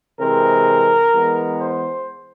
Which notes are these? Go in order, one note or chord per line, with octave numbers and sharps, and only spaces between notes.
C3 E3 G#3 C4 A#4
E3 G#3 B3
C5